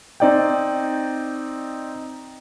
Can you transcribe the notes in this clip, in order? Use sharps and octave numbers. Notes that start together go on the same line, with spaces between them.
C4 D#4 D5 D#5 G5